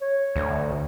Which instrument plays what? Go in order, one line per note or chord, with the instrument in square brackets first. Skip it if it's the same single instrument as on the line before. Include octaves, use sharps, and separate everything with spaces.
[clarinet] C#5
[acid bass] D2